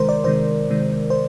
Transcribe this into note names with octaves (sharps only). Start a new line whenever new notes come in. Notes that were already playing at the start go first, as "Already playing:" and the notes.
Already playing: C3 D#3 G#3 A#4 C5
D5
C3 D#3 G#3 C5
C3 D#3 G#3
C5